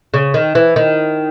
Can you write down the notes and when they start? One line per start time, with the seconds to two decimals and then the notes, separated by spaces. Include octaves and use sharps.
0.14 C#3
0.34 D#3
0.55 E3
0.76 D#3